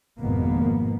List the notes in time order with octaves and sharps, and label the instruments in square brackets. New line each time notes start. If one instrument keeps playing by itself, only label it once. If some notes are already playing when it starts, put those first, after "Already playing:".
[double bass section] G#1 F2 B2 A#3 B3